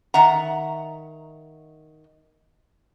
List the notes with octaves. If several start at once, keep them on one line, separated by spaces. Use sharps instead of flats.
D#3 E5 F#5 A#5